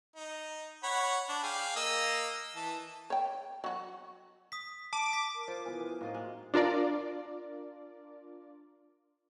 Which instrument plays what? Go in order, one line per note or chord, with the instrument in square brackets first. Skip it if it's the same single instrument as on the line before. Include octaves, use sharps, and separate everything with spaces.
[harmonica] D#4
C#5 F#5 B5
D4
G#4 F5 G5
A#3 D#5 E6
E3 A5
[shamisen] C#5 G5
F#3 F#4
[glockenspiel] D#6 B6
[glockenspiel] A5 [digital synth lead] D6
[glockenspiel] B6
[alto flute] A#4
[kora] F4 [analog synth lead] C5
[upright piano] E3 F3 B3 [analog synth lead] G#5
[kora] A2 F4 D#5 [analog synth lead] A#3 [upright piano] C4 D#4 F#4
[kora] G#3
[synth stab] D4 F4 A#4 D5